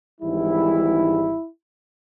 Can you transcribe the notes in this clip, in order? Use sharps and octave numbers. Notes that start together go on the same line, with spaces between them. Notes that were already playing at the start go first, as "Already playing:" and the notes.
G#1 G#2 E3 G3 E4